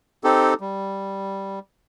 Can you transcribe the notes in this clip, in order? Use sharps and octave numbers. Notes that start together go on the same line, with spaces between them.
C4 D#4 G4 A4
G3